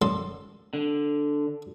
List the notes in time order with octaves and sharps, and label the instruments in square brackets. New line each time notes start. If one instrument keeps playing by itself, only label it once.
[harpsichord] F#2 A4 C6
[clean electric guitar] D3